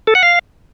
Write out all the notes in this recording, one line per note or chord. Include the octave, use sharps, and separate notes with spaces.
A4
F#5
F5